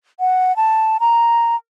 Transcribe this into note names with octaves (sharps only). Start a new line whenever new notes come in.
F#5
A5
A#5